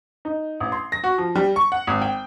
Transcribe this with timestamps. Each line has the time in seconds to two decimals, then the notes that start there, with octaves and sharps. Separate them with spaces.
0.25 D#4
0.60 A1
0.72 C6
0.92 A#6
1.04 F#4
1.18 F3
1.35 G3
1.56 C#6
1.72 F#5
1.87 G#1
2.02 G5